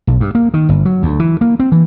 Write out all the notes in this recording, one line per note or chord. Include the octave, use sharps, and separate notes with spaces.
B1
G2
A#3
D#3
G1
F#3
D2
E3
A#3
C4
E3